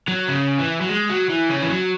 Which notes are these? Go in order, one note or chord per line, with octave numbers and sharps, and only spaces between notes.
F#3
C#3
E3
F#3
G#3
F#3
E3
C#3
E3
F#3